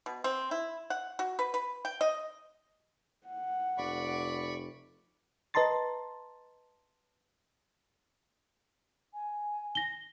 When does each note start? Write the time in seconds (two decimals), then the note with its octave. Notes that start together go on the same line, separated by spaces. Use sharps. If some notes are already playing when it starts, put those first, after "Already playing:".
0.06 B2
0.24 C4
0.51 E4
0.90 F#5
1.19 F#4
1.39 B4
1.54 B4
1.85 G5
2.01 D#5
3.27 F#5
3.78 F1 D5 B5 C#6
5.54 B4 D#5 A5 A#5 C6 A6
9.12 G#5
9.75 A#6 G7